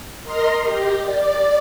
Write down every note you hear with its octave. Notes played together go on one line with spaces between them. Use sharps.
A#4 D#5 A#5 C6
G4
D5